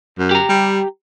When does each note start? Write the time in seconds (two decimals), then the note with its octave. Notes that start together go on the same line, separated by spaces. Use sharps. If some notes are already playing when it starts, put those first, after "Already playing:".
0.19 F#2
0.31 G4 A#5
0.49 G3